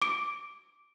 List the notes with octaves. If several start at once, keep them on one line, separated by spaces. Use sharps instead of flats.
D6 D7